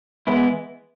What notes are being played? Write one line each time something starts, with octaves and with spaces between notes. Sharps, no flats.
E3 G#3 B3 E4